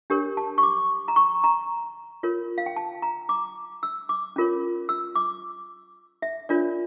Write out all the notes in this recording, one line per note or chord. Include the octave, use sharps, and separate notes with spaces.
D4 G4 A#4 C#5
A5
C#6
D6
A#5
C#6
A#5
F4 A#4 C#5
F5
G5
A5
A#5
D6
E6
D6
C#4 F4 A#4 C#5
E6
D6
E5
D4 F4 A#4 C#5 D5